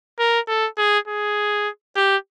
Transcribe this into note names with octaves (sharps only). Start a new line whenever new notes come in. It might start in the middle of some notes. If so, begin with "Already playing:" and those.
A#4
A4
G#4
G#4
G4